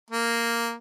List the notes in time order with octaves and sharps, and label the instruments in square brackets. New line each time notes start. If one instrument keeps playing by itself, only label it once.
[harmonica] A#3